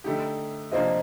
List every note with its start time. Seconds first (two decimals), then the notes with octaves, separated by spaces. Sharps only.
0.04 D3 A3 D#4 G4
0.71 C3 F3 A#3 D4 F4 C5 D#5